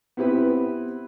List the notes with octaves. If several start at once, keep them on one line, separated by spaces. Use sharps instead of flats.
B3 C4 E4 G4 B4